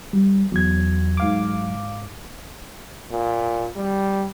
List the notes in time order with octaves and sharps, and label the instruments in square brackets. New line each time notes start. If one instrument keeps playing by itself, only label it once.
[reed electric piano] G3
[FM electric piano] E2 [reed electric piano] F#3 G#6
[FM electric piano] G#2 F5 D6
[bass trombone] A#2
G3